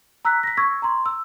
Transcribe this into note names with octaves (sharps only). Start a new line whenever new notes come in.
A#5 E6 F#6 B6
A#6 B6
C#6 E6 G#6
A#5 C6
E6